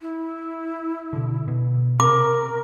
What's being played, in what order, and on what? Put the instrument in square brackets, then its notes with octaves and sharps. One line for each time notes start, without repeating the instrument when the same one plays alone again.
[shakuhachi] E4
[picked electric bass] B2 D3
B2
[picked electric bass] C3 [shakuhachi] A#4 [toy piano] D6